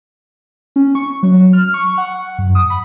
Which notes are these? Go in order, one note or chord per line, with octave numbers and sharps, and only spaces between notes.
C#4
C#6
F#3
F6
C#6
F#5
F#2
D#6
B5